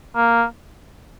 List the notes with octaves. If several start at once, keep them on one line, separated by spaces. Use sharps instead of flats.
A#3